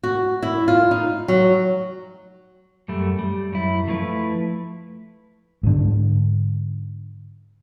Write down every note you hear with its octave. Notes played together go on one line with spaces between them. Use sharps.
F#4
E4
F4
D#4
F#3
F#2 G3 A3
G3
F#2 E4
F3 A3 E4 B4
G#2 D3